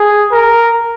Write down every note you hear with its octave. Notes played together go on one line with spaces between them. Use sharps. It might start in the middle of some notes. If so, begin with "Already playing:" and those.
Already playing: G#4
A#4